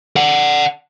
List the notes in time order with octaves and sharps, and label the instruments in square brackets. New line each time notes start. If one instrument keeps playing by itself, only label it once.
[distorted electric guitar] D5 F#5